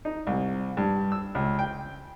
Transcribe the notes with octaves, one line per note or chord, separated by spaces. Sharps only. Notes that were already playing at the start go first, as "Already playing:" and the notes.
D#4
C2
G2
E6
C#2
G5